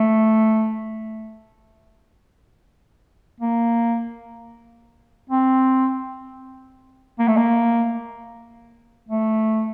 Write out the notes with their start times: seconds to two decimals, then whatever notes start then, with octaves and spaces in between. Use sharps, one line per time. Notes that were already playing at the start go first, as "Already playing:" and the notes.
Already playing: A3
3.40 A#3
5.30 C4
7.19 A#3
7.28 A3
7.37 A#3
9.09 A3